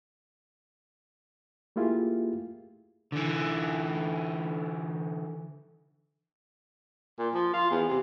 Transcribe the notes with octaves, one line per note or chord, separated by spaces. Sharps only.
A3 A#3 E4 F4 G4 G#4
D3 E3
A#2
F3
F4
E2
C3